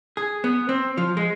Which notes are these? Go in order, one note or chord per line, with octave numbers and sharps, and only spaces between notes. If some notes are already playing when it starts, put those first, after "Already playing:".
G#4
B3
C4
F3
G#3